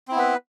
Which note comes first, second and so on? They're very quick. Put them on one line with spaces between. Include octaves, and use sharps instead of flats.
C4 E4 B3 B4